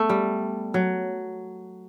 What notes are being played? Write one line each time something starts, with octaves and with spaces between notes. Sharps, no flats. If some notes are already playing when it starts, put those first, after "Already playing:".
Already playing: A3 B3
G3
F#3